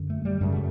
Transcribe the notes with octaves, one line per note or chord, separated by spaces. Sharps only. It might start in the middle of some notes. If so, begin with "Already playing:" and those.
Already playing: F#2 D3
A3
G3
F#2 C#3 G#3
A3